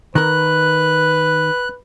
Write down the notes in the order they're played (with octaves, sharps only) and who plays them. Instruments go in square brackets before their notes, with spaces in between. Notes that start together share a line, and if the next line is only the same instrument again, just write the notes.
[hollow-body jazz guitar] D#3 A#4 [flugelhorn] B4 [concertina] F#6